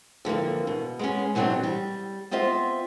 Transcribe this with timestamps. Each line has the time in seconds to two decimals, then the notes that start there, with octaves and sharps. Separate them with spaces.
0.25 F2 D3 E3 A#3
0.67 B2
0.99 G#3 B3 C#4
1.35 B2 E3 F#3 C4 D4 G4
1.63 G3
2.31 B3 C4 F4 D#5 E5